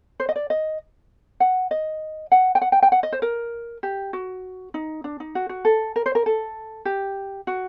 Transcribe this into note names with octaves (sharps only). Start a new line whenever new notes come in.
C5
D#5
D5
D#5
F#5
D#5
F#5
G5
F#5
G5
G5
F#5
D#5
C5
A#4
G4
F#4
D#4
D4
D#4
F#4
F#4
A4
A#4
C5
A#4
A4
G4
F#4